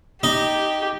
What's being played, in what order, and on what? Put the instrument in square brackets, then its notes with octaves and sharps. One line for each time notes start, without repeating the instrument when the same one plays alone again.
[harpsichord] D#4 [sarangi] G4